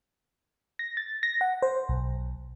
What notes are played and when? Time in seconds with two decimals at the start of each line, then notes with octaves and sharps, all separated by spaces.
0.79 A#6
0.97 A6
1.23 A#6
1.41 F#5
1.62 C5
1.89 B1